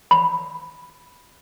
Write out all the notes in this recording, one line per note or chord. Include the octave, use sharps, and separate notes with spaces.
B5